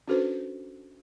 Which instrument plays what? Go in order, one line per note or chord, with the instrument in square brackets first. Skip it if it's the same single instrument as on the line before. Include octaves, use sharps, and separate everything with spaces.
[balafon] C#4 D4 F#4 A4 B4 C5